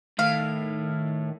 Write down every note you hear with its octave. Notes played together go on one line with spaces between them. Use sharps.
A2 D#3 F5